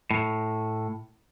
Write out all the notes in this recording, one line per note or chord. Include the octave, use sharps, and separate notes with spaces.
A2